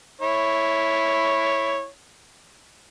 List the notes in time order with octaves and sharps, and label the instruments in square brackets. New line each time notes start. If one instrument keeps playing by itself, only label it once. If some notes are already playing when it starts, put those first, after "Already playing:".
[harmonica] E4 C#5